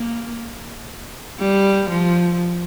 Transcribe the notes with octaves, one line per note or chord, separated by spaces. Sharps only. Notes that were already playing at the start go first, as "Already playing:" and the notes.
Already playing: A#3
G3
F3